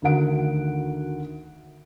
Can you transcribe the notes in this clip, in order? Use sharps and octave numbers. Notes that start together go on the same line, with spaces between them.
D2 D#3 F#4 A#4 F#5 D7